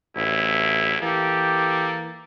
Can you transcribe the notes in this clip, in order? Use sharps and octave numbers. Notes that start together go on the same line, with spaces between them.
A1 D2 E4
E3 A#3 G4 A4